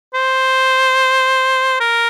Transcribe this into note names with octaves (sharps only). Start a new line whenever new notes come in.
C5
A#4